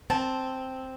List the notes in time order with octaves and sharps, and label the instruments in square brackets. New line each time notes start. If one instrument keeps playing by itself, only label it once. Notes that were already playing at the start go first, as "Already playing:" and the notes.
[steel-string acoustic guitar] C4 [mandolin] A5